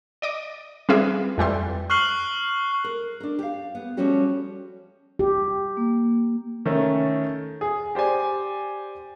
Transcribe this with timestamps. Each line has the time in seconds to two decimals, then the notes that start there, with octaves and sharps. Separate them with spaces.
0.22 D5 D#5 D6
0.89 G3 C4 F4 G#4 B4 E5
1.38 F2 E3 G3 C6
1.90 C#6 F6 F#6 C7 F#7
2.84 A#4
3.20 D4 A#4
3.39 G4 F5
3.75 B3
3.97 F3 G3 A3 C#4 F#4 G4
5.19 G4
5.77 A#3
6.66 D#3 A3 C#4
7.61 G#4
7.95 G4 C5 D5 G#5